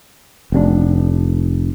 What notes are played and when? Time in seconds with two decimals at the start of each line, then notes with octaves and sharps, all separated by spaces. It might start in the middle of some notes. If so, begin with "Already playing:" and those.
0.52 F1 B2 D4